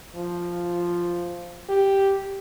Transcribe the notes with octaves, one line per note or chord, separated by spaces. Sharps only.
F3
G4